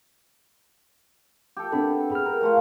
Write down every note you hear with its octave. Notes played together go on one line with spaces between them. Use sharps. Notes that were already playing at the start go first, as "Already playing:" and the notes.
G4 A4
B3 C4 D4 A4
G#4 B5 F6
A#4
F3 A3 F4